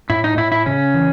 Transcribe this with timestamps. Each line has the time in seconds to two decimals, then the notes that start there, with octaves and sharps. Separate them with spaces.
0.10 A2 E4
0.24 D#4
0.38 A2 E4
0.52 E4
0.66 C#3 C#4
0.94 E3